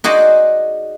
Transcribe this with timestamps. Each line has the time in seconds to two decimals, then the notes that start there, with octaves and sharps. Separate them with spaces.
0.04 D#4 F#4 G#4 C5 D5